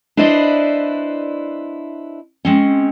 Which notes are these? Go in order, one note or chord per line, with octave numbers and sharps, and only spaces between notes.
D4 E4 B4 C5 D5 D#5
G#3 C4 C#4